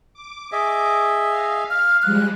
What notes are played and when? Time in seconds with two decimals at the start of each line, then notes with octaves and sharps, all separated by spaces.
0.14 D6
0.52 G#4 D#5 E5
1.29 F5
1.71 F6
2.03 F3 G3 G#3 F#6